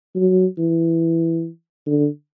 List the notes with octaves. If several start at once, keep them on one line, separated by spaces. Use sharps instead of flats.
F#3
E3
D3